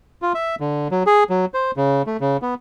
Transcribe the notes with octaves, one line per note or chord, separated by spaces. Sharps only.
F4
E5
D3
F#3
G#4
F#3
C5
C#3
A3
C#3
B3